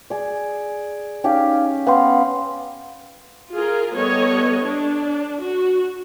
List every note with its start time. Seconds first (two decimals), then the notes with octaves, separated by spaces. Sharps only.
0.10 G#4 D5
1.24 C#4 D#4 G4 F5
1.87 B3 F5 G5 C6
3.51 F4 G#4 A#4
3.93 G3 B3 A4 C#5 D#5
4.64 D4
5.39 F#4